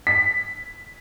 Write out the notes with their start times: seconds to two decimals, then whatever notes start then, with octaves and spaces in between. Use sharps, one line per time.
0.07 B6